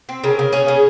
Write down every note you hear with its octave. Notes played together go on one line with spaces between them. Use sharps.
C4
C#3 A#4
C#3
C#4 G#4
C#3